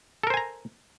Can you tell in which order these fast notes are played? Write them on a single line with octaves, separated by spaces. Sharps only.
A4 A#4 C5 G#5 A#5